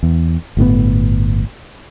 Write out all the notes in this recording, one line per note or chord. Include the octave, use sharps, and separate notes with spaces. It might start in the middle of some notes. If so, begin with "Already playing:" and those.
E2
G1 A2 C#3 B3